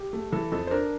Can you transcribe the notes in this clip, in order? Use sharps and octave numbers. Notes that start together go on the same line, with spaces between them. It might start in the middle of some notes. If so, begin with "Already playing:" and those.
Already playing: G4
A3
E3 A4
F2 A4
C5
D4 A#4